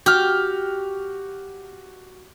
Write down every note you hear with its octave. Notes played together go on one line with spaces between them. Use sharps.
F#4 G4 F6